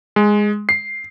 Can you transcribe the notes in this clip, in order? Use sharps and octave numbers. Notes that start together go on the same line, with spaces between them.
G#3
C7